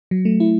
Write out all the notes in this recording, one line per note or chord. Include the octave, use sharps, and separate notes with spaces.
F#3
A3
E4